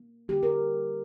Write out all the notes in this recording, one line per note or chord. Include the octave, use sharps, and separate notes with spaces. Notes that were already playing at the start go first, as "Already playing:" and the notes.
Already playing: A#3
D3 G3 A#3 G4
A#4